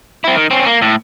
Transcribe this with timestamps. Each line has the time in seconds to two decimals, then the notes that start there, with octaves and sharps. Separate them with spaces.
0.24 C4 E4
0.36 D#3
0.51 C4 C#4
0.66 A#3
0.82 A2